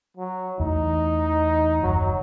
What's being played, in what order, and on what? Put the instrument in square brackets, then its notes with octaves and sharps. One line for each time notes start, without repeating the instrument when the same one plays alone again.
[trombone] F#3
[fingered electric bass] E2 E3 A3 [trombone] D#4
[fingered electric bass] F#1 D#2 [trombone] F#3